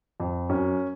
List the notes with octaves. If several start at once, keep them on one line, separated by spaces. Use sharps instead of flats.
F2
F#2 C#4